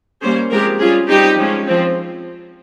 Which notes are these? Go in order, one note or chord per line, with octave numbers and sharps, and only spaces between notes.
G3 A#3 C#4 G#4 C5
F3 G#3 C4 G4 A#4
G3 C#4 F4 G#4
G3 C4 D#4 G4
F3 G#3 C#4
F3 C4